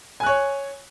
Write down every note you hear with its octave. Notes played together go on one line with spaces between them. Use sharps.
C#5 G#5 F#6